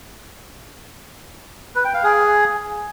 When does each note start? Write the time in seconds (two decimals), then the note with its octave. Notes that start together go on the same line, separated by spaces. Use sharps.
1.76 B4
1.85 G5
1.94 F5
2.03 G#4